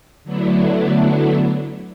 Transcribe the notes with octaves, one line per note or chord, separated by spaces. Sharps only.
D3 F#3 A3 B3 D4 E4